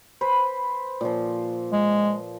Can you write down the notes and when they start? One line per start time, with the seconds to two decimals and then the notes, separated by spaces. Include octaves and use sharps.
0.21 B4 C5 B5
1.01 A#2 F3
1.73 G#3